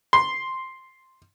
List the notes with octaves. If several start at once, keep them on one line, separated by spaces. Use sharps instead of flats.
C6